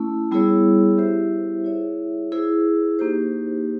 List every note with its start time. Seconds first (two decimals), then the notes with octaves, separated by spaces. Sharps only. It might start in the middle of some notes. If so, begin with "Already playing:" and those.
Already playing: A3 C#4 E4
0.31 G3 B3 E4 G#4 C#5
0.98 E4 G4 C5 E5
1.64 E4 G#4 C#5 E5
2.32 E4 G#4 C5
2.99 A#3 D#4 G4 C5